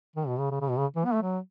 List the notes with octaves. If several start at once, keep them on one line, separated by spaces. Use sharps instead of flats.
D#3
B2
C#3
C#3
C#3
B2
C#3
E3
B3
A3
F#3